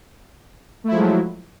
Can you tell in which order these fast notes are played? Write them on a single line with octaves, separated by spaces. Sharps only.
A3 E4 F3 G#3 F#3